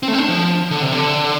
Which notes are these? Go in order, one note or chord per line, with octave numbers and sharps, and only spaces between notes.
C4
A3
C4
D4
F3
D3
C3
D3